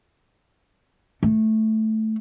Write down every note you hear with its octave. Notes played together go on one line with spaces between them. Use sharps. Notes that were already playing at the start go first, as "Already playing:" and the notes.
A3